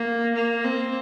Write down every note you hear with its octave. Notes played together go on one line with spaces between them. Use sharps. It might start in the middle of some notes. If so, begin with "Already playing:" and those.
Already playing: A#3
A#3
C4